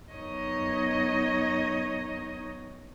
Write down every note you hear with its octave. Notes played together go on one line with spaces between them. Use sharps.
F#2 B3 D#4 C#5 D#5 D#6